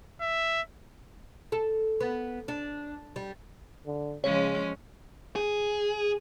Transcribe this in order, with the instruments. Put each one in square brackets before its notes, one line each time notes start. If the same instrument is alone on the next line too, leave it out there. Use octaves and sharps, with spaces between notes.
[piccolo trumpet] E5
[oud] A4
B3
D4
G3
[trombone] D3
[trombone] C#3 [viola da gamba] F3 G#3 C#4 [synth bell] C#5
[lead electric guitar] G#4